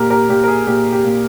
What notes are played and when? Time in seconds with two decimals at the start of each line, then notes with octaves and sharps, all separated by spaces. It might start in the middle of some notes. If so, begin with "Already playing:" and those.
Already playing: A#2 G4 A#4
0.10 G4 A#4
0.29 A#2 G4
0.44 A#4
0.48 G#4
0.67 A#2 G4
0.92 G4
1.05 A#2